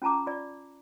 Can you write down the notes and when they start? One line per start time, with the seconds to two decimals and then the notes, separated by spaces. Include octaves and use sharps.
0.02 C#4 F4 A5 A#5 D6
0.27 F4 D5